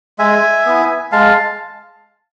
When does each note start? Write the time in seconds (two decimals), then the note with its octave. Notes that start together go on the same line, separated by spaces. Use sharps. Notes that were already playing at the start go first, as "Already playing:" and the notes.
0.19 G#3 E5 G#5
0.65 B3 E4
1.12 G#3 F5 A5